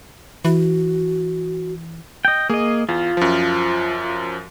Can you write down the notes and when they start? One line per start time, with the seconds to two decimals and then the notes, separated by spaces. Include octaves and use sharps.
0.45 E3 F#4
2.25 D#5 G5
2.50 A#3 G#4 D#5
2.89 E2 F4
3.17 F#2 F3